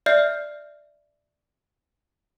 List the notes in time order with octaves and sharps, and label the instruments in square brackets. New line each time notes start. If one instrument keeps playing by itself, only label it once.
[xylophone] D5 E5 F6 G6 C7